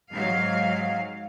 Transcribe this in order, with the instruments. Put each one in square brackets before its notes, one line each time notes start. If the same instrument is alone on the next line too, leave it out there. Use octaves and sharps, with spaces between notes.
[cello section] G#2 F#3 F5